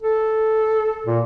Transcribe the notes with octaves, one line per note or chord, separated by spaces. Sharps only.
A4
A#2